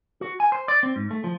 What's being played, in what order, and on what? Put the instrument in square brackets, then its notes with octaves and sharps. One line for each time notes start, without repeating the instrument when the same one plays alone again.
[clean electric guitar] F#4
G#5
C5
D5
C4
G#2
A3
F3